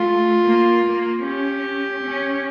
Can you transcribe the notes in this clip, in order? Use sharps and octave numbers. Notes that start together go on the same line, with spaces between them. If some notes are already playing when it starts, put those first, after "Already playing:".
Already playing: A3 F4
A#3
A#3
C#4 G4
C#4